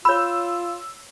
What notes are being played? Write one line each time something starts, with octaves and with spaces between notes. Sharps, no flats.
F4 C#5 B5 E6